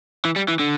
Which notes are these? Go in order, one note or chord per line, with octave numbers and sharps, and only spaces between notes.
E3
G3
E3
D3